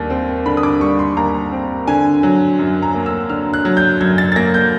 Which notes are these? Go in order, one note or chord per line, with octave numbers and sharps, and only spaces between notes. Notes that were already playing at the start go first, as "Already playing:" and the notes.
Already playing: D#2 D3 G3
C4
D3 B5
D#6
D6
G3 C#6
C6
D#2 A#5
C4
D3 G#5
F#3
F#2
A#5
A#3
E6
D3 F6
F#6
F#3
G6
F#2 G#6
A6
A6
A#3 A#6
G6